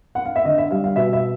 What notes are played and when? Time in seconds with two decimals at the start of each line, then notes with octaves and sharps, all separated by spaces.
0.15 F#5
0.25 F5
0.36 E5
0.45 D3 D#5
0.58 E5
0.71 G3 F5
0.84 F5
0.96 B2 E5
1.13 E5